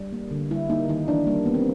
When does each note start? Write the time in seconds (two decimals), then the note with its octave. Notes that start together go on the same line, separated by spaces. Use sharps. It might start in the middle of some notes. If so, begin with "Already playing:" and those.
Already playing: G3
0.12 A#3
0.31 D3
0.51 G3 E4
0.69 A#3 D#4
0.88 D#3 D#4
1.08 E3 D4
1.27 G3 A#3
1.46 A#3 B3
1.54 C4